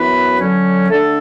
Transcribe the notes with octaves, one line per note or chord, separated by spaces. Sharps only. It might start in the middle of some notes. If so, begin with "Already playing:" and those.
Already playing: F#2 E3 B3 E4 B4
D3 F#3 C#4
D3 A3 D4 A4